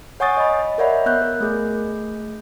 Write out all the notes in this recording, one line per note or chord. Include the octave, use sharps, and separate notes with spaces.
C#5 F#5 G#5 C#6 D#6 A6
D#5 B5
A#4 C#5 D5 E5 F#5 B5
B3 F#6 G6
A#4
A3 G#4 G6